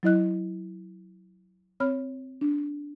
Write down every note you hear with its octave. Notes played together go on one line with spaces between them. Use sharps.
F#3 E4 D#5 F#6
C4 C#5 B5 F6
D4